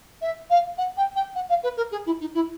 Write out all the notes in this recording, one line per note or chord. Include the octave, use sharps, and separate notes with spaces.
E5
F5
F#5
G5
G5
F#5
F5
B4
A#4
G#4
E4
D#4
E4